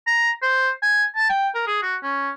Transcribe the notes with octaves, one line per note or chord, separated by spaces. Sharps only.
A#5
C5
G#5
A5
G5
A#4
G#4
F#4
C#4